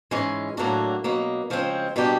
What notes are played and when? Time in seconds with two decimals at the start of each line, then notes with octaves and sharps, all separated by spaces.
0.11 G#2 E3 G#3 C#4
0.57 A2 F#3 A#3 D4 F#4
1.04 B2 F#3 A#3
1.50 C#3 F3 G#3 C4
1.96 B2 G3 A#3 D4 G4